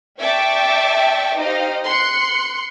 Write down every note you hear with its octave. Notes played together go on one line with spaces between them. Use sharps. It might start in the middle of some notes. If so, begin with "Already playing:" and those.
D5 E5 G5 A5 C#6 D6
D#4 G4 C5 D#5 F5
C6 F#6 C#7